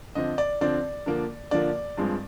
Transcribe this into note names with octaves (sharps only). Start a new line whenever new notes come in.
D3 F3 C4 D#5
D5
D3 F3 C4 D5
D3 F3 A#3
D3 F3 A#3 D5
G2 F3 G#3 C4